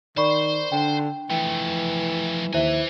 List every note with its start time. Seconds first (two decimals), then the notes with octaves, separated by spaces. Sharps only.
0.17 D#3 C5 D5 B5 C#6
0.72 D3 G5
1.30 E3 F3 A3 G5
2.53 D#2 E4 B4 C5 E5 G#5